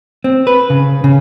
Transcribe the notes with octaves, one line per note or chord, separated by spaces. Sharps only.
C4
B4
C#3
C#3